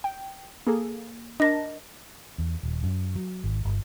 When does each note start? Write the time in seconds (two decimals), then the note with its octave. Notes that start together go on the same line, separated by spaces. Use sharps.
0.04 G5
0.67 A#3 G#4 A4
1.40 D4 A#4 D#5 A5 A#6
2.38 E2
2.63 D#1
2.83 F#2
3.15 F#3
3.44 G#1
3.65 G1